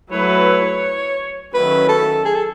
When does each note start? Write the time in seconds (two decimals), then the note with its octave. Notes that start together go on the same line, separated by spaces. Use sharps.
0.11 F#3 A3 E4 B4 C#5
1.53 D#3 F#3 A3 C#4 E4 B4
1.89 A4
2.25 G#4
2.35 A4